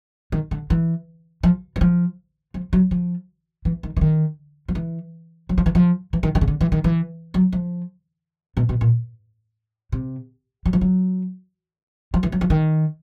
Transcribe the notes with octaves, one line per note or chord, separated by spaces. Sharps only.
D#3
D3
E3
F3
E3
F3
F3
F#3
F3
E3
D#3
E3
D#3
F3
E3
F#3
F3
E3
F3
E3
D#3
D#3
C#3
D3
E3
D#3
E3
F#3
F3
B2
B2
A#2
C3
F#3
F3
F#3
F3
E3
F#3
F3
D#3